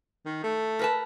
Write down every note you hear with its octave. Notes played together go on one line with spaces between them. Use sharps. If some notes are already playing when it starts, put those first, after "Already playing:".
D#3
A3
A#4 B4 A5